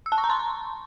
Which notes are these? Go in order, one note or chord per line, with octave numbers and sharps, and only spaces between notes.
E6
A5
C#6
A#5
C6